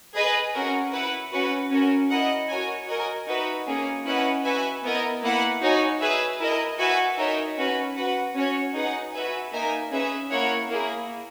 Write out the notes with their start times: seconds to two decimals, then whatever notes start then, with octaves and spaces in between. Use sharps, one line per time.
0.15 G#4 B4 D#5
0.54 C#4 F#4 A#4
0.92 E4 B4 F#5
1.32 C#4 F#4 B4 F#5
1.70 C#4 F#4 A#4
2.10 E4 A#4 D#5 F#5
2.48 F#4 A#4 C#5 G#5
2.88 F#4 A#4 D#5 G#5
3.27 D#4 F#4 B4 E5
3.66 A#3 C#4 G#4
4.05 C#4 E4 B4 D#5 F#5
4.44 F#4 B4 E5 G#5
4.83 B3 E4 A#4 D#5
5.22 A#3 E4 B4 F#5
5.61 D#4 F#4 C#5 G#5
6.01 G#4 B4 E5 G#5
6.39 E4 A#4 D#5
6.79 F#4 B4 E5 G#5
7.18 D#4 A#4 C#5 E5
7.57 C#4 F#4 B4
7.96 F#4 B4 F#5
8.35 C#4 F#4 C#5
8.74 D#4 G#4 B4 F#5
9.13 F#4 B4 E5 G#5
9.52 A#3 D#4 A#4 E5 G#5
9.91 C#4 G#4 B4 E5
10.30 A#3 E4 A#4 C#5 F#5
10.69 A#3 E4 G#4